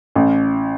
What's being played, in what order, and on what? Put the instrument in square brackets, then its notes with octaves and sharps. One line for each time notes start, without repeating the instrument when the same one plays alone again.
[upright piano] A1